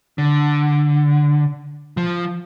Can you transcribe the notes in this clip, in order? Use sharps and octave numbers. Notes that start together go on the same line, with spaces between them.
D3
F3